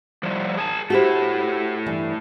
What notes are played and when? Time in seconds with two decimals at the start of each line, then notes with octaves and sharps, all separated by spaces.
0.23 F3 G3 E4
0.57 G#4 G#5 A5
0.90 A3 E4 F#4 G4 C5
1.86 G2 E3